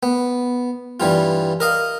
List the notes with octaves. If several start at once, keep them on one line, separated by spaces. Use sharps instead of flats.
B3
G2 E3 G3 F4
A#4 D#5 F5